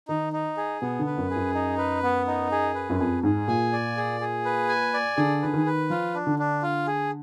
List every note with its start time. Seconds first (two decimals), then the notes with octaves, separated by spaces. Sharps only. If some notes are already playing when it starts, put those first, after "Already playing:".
0.08 D#3 D#4
0.33 D#4
0.57 G#4
0.82 B2 B3
0.99 D3
1.06 B4
1.18 F#2
1.30 G#4
1.36 F#2
1.54 D#4
1.78 B4
2.03 B3
2.27 D#4
2.52 G#4
2.75 B4
2.90 F#2
2.99 F2 G#4
3.23 G#2 G#4
3.48 A#2 G#5
3.73 D5
3.97 G#4
4.20 G#4
4.45 B4
4.68 G#5
4.94 D5
5.17 D3 G#4
5.42 D3 B4
5.54 D#3
5.66 B4
5.90 F3 F4
6.14 D4
6.27 D3
6.39 D4
6.63 F4
6.87 G#4